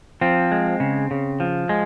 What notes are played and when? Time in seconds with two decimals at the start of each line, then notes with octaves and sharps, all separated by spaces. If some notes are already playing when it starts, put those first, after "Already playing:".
0.21 F3 C4
0.51 G#3
0.80 C#3
1.11 C#3
1.40 F3
1.69 G#3